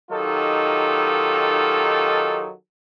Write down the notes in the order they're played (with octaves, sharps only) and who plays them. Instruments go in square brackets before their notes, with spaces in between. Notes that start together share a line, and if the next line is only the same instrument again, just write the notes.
[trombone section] D#3 F#3 D#4 F4 G4 A4